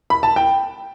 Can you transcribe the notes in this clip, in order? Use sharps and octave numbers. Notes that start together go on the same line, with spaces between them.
B5
A5
G5